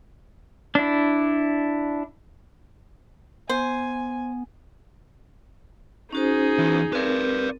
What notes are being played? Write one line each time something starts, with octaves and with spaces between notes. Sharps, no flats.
D4 E4
B3 C5 G#5
C#4 D#4 F#4 G#4 C5
E2 E3
C4 A#4 B4 D5